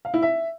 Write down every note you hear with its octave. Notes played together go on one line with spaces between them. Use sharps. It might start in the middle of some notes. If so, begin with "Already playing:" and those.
F5
E4
E5